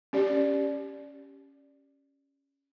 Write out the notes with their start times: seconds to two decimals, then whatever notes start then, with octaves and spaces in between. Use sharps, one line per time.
0.13 C#4 G4 D5